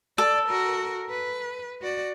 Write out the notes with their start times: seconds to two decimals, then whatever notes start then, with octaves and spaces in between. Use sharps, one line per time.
0.18 A4 D5
0.49 F#4 A#4
1.10 B4
1.82 F#4 D5